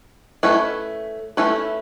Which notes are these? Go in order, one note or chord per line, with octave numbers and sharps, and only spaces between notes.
A3 C#4 E4 B4
A3 C#4 E4 B4